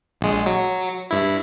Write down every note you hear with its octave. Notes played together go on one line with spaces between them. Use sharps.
A#1 G#3
F#3
G2 E4